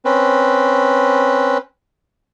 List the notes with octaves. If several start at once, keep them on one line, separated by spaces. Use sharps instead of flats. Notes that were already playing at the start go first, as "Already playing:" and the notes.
C4 C#4 B4